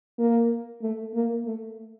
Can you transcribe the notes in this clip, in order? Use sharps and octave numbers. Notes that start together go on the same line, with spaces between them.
A#3
A3
A#3
A3